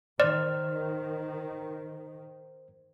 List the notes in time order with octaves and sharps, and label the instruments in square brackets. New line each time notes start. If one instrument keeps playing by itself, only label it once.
[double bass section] D#3 [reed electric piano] C5 F6 [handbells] D5